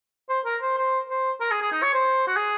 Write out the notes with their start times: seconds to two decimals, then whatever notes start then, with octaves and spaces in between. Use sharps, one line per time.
0.29 C5
0.45 A#4
0.61 C5
0.77 C5
1.09 C5
1.40 A#4
1.51 G#4
1.62 G#4
1.72 D#4
1.82 C#5
1.94 C5
2.28 F#4
2.36 G#4